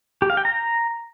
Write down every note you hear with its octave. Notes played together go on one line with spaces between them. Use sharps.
G4
F5
G5
A#5